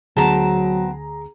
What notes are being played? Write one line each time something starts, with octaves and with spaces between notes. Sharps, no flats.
D2 D3 F#3 B3 C4 G#4 A5 A#5